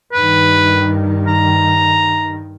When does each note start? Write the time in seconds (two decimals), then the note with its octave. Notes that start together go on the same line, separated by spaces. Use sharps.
0.13 G2 D#3 B4
1.28 A#5